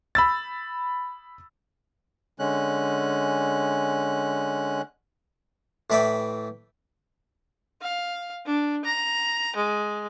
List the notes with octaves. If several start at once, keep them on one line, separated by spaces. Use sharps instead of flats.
B5 E6 A6
D3 G#3 C#4 F#6
A2 E3 B4 D5 E5 G5
F5
D4
A#5
G#3